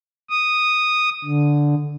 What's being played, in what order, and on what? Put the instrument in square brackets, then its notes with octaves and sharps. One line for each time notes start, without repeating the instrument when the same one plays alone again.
[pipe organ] D#6
D3